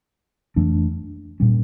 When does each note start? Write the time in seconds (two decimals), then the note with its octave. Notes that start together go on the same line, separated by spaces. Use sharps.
0.56 F2 E3 A3 D4
1.40 A#2 G3 C#4